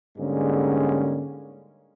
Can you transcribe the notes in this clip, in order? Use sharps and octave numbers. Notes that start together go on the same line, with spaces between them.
G#2 D3 G3 G#3 A#3 C#4